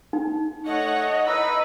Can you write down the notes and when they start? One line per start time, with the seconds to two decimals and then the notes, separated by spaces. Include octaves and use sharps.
0.13 D#4
0.66 A3 C#5 D#5 F#5
1.26 D#4 E4 B4 E6